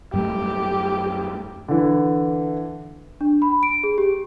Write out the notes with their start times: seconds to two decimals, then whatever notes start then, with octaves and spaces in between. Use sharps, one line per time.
0.13 F#2 G3 A3 G4
1.68 D3 E3
3.21 D4
3.42 B5
3.63 D7
3.84 G#4
3.98 G4